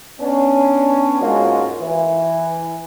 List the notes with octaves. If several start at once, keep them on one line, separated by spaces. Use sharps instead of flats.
B3 C#4 D4
G#2 G#3 A#3 C#4 F4 F#4
E3